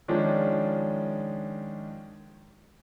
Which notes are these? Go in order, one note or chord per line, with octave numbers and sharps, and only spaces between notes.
D#3 F3 G#3 C#4 D4